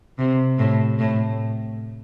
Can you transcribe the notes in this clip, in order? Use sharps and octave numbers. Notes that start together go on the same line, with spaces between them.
C3
A2
A2